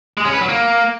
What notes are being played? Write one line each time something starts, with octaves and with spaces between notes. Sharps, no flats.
G#3
C#4
B4
F#3
A#3